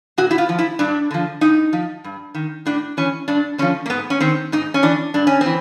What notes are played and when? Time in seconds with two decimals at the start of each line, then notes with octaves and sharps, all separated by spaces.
0.18 A#2 F#4
0.31 E4
0.38 F4
0.49 F3
0.59 E4
0.79 G2 D4
1.11 D3 F3
1.41 A2 D#4
1.73 F3
2.04 G2
2.34 D#3
2.66 A2 D4
2.97 E3 C#4
3.28 G2 D4
3.58 D3 F3 C#4
3.86 A#3
3.90 G#2 B3
4.10 C#4
4.20 D#3 C4
4.52 G#2 D#4
4.74 C#4
4.82 E3 D4
5.14 G2 D4
5.27 C#4
5.41 E3 C4